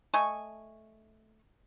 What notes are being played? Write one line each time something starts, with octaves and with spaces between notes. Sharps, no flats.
A3 D#5 G#5 C#6